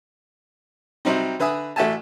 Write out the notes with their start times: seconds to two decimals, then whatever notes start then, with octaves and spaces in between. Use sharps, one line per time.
1.05 C3 F#3 G3 C4 D#4
1.40 D3 B4 E5 G#5 D#6
1.76 A1 A3 F#4 E5 G#5 A5